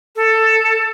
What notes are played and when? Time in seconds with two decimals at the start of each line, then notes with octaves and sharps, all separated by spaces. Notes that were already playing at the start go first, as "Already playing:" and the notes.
0.16 A4